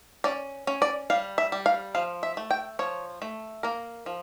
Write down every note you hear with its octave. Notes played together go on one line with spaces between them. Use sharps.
C#4 D5
C#4
D5
G3 F5
E5
G3
F5
F3 F5
E5
A3
G5
F3 C#5
A3
A#3 A#4
F3